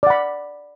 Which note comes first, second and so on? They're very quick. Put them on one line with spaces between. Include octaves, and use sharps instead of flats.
D5 F#5 B5